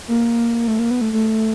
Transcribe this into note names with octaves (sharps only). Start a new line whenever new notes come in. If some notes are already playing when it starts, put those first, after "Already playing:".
A#3
A3
A#3
B3
A3
A3